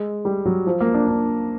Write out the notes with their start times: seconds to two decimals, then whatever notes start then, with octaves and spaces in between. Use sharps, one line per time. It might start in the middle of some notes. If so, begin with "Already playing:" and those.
Already playing: G#3
0.25 G3
0.45 F#3
0.67 F3
0.81 A#3
0.94 D4
1.08 D4